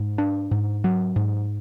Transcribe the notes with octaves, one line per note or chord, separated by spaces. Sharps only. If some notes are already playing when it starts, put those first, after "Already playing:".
Already playing: G#2
D4
G#2
F#3
G#2